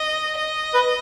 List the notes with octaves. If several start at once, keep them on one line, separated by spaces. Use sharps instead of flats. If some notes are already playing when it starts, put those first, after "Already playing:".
Already playing: D#5
D#5
B4